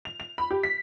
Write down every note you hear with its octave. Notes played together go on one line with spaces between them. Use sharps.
F7
F7
B5
G4
B6